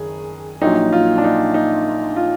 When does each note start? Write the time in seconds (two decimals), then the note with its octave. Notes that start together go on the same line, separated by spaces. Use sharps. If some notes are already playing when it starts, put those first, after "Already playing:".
Already playing: F#1 D#3 G#4
0.62 A#1 A#2 F#3 A#3 D#4
0.93 F4
1.18 D4
1.24 D#4
1.54 D#4
2.16 F4